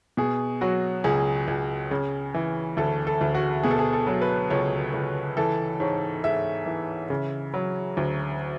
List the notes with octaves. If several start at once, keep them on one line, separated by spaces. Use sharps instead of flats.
B2 G#4
F#3 F#4
C#2 G#4
C#2
C#3
E3
D2 A4
A4
D2
F#4
B2 G#4
A4
G#4
A4
F#3
B4
C#2 C#5
C#2
E3 A4
G#2 C#5
G#2 E5
E3
C#3
F#3
D2